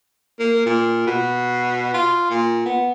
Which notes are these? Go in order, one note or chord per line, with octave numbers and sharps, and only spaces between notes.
A#3
A#2
B2
F4
A#2
B3